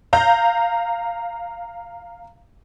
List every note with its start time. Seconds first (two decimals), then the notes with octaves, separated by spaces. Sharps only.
0.13 F5 A#5 G6